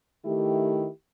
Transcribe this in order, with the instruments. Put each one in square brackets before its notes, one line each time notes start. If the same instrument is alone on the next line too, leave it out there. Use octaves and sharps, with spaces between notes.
[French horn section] D#3 A3 E4 G4